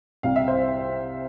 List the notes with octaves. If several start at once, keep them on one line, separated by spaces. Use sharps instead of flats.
C2 C3 G3 F5
E5
C5